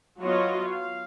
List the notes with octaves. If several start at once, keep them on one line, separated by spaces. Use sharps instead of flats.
F#3 B3 F4 F#4 C#5 D#5
F5